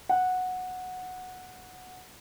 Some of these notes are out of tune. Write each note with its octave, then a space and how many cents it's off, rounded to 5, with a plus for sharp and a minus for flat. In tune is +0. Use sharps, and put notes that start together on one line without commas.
F#5 -10